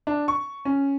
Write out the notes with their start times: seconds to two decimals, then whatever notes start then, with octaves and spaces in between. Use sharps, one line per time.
0.07 D4
0.28 C#6
0.65 C#4